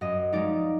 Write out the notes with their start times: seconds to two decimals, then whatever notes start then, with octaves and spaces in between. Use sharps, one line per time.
0.01 F#2 D#5
0.33 F3 G#3 D#4 D5